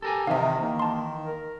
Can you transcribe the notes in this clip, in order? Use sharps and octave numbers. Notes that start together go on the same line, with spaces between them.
G4 A4 A#4 G#5
C3 D#3 E3 D#4 E5 F5
D#3 A#3
A5 C6
A#4